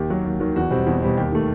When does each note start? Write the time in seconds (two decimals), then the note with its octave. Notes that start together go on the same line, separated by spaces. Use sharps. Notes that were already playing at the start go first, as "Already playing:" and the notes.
Already playing: D#2 G4
0.10 D#3 F#3
0.25 D#2
0.40 D#3 F#3
0.56 E2 F#4
0.70 B2 G3 C4
0.87 E2
1.02 B2 G3 C4
1.17 D#2 G4
1.32 D#3 A3